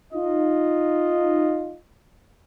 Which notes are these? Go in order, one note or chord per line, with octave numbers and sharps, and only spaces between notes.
D#4 F4 D#5